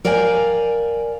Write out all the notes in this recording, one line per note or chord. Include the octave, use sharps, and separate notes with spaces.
A#4 D5 F5 G5 G#5